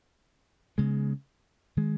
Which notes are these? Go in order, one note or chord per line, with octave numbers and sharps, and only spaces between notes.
C#3 G#3 B3
D#3 G#3